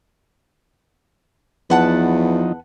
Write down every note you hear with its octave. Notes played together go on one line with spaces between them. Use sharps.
E2 F3 D#4 B4 F#5 A5